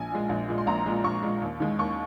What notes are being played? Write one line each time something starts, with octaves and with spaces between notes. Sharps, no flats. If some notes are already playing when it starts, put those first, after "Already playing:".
Already playing: A#1 G#5
A#2 G#3
A#1
A#2 G#3
C6
A#1 A#5
A#2 G#3
A#1 C#6
A#2 G#3
D#2
D#3 G#3
D#2 C#6